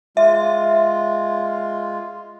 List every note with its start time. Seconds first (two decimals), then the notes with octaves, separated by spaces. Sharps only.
0.17 G#3 F4 E5